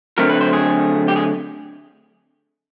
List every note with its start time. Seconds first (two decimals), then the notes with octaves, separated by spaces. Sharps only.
0.18 D3 F#3 A3 C4 A#4
0.29 B4
0.41 C5
0.53 G#4
1.08 G4
1.16 G#4